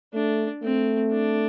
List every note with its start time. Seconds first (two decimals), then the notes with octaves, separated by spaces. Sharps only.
0.14 A3 D4
0.63 A3 C4
1.12 D4